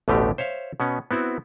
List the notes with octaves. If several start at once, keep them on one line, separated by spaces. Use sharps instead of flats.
A1 D2 B2 D3 A3 G4
C5 C#5 E5 F5
B2 B3 C#4
B3 C4 E4 F#4